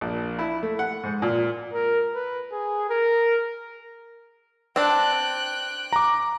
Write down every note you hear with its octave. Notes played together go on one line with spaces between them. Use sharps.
A#1
E4
A3
F#5
G#2
A#2
A#4
B4
G#4
A#4
C4 D4 G5 F#6
A#5 D6